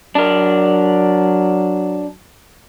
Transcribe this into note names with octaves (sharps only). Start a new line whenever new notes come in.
F#3 D4 A#4